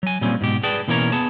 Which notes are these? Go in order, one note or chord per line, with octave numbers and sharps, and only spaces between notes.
F#3 G#5
A#2 G3 C4 C#4
G#2 B2 G4
G#4 B4 D5 G5 A5
B2 E3 A#3 C#4 A#4 C#5
B3 G#4 A5